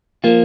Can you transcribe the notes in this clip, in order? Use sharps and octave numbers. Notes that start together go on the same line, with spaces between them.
F3 A#3 F4